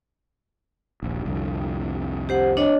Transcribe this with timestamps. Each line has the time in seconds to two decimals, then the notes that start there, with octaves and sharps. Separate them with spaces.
1.03 D#1 A#1
1.26 C2 F2 D3
2.29 G4 C5 F#5
2.57 D4 C#5 D#5